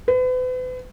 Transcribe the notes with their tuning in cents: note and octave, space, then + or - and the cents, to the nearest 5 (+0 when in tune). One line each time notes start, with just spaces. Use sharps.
B4 +40